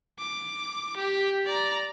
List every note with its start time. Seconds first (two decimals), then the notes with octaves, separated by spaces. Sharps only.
0.19 D6
0.97 G4
1.46 D5 A#5